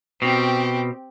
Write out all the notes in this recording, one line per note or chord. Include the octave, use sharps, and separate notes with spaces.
B2 C4 G4